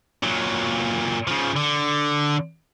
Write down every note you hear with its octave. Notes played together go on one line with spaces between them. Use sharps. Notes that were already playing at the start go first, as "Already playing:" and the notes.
A#2 F#3
C#3 F3
D3